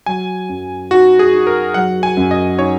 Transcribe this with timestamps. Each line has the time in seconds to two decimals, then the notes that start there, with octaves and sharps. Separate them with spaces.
0.06 F#3 G#5
0.49 F#2
0.91 D#4 F#4
1.19 G#4
1.33 D#4
1.47 A#4
1.74 F#3 F#5
2.03 G#5
2.17 F#2
2.31 D#5
2.59 D#4 C#5